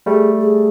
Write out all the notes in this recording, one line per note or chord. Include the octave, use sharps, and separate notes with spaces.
G3 A3 G#4
G#4